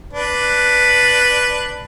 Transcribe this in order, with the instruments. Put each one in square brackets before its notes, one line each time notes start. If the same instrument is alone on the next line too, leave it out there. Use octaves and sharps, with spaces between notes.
[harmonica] D4 B4